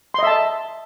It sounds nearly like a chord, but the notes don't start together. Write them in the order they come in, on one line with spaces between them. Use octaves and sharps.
C6 D#5 E5 A5